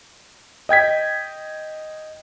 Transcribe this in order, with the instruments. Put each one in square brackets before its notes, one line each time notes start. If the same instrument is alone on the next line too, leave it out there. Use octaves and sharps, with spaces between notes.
[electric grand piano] D#5 G5 G#6 B6